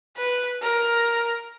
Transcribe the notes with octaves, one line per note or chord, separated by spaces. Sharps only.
B4
A#4